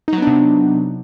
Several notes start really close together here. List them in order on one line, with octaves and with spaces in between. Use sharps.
D#4 F#3 B3 D4 C3